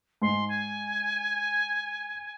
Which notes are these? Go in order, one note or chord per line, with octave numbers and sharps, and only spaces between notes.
G#2 C6
G#5